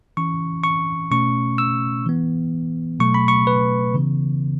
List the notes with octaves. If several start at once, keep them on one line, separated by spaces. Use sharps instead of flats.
E3 C#4 C#6
C#6
B2 A3 C#4 C#6
E6
E3 B3
B2 F#3 A3 C#6
B5
C#6
B4
C#3 E3 B3